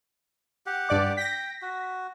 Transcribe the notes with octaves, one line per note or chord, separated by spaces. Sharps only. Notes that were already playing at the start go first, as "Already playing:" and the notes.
G4 F#5
G2 D5 D6
G5 A#6 B6
F#4